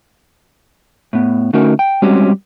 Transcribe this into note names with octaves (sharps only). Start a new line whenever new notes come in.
A2 B3
D3 A3 C#4 D#4 F#4 A#4
G5
G3 G#3 C4 C#4 F#4 G4